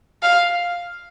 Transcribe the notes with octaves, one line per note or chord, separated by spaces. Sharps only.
F5